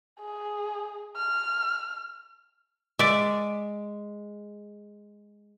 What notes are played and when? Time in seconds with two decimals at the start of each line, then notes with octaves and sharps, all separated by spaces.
0.20 G#4
1.17 F6
2.99 G#3 D5 E5